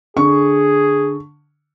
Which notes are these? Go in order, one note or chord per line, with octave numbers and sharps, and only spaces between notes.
D3 G#4 C#6